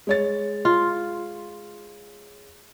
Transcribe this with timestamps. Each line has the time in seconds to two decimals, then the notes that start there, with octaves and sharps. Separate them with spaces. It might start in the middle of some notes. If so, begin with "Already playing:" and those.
0.07 G#3 C#5 A6
0.65 F4